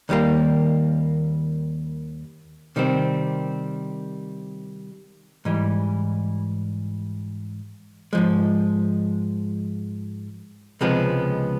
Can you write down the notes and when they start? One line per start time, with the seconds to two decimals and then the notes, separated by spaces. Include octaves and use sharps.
0.09 D#2 D#3 G3 A#3
2.76 C3 D#3 G3 C4
5.45 G#2 E3 G3
8.13 G#2 F3 G#3
10.81 C#2 C3 F3 G#3 B3